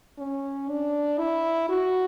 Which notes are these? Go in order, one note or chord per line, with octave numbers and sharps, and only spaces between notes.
C#4
D4
E4
F#4